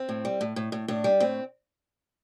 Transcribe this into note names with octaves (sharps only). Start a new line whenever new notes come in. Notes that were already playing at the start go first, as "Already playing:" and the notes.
Already playing: C4
A2
G3
A2
A2
A2
A2 D4
G3
A2 C4